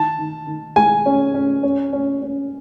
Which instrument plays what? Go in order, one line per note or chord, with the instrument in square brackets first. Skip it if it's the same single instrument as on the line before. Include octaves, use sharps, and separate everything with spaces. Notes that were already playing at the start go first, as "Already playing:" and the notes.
Already playing: [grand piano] D#3 [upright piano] A5
[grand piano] D#3
D#3
[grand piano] G#3 [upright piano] G#5
[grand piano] C#4
C#4
C#4
C#4
C#4